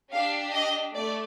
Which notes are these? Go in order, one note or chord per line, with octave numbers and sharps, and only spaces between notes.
D4 G4 F5
D#5
A3 D5